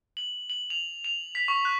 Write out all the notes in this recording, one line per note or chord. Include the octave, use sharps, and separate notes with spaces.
F#7
F#7
F7
F7
B6
C#6
F#6